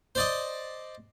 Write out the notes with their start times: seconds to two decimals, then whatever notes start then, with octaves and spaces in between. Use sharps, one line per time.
0.15 C5 D5 D#5